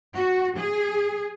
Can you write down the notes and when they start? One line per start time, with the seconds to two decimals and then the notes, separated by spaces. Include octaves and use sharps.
0.15 F#4
0.58 G#4